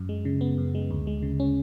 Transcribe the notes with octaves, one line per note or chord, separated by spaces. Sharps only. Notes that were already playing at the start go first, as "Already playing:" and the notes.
Already playing: F#2
G#3
C#3
B3
F#2
G#3
D2
G#3
C#3
C#4